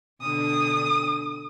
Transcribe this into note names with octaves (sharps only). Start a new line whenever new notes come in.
B2 D3 D4 D#6